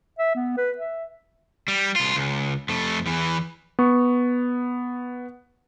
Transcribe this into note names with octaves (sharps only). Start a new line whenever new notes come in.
E5
B3
B4
E5
G3
C2 F4
C#2
F2 A3
E2 E3
B3 C#6